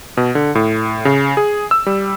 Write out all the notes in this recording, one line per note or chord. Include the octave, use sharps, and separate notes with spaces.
B2
D3
A2
C#3
G#4
E6
G3